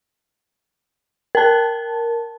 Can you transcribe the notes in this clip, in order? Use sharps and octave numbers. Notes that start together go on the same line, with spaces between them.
A#4 A5